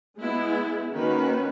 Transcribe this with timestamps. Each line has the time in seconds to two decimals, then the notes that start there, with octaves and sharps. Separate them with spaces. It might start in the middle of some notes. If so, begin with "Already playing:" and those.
0.18 G#3 B3 E4
0.91 D#3 A#3 C#4 F#4 B4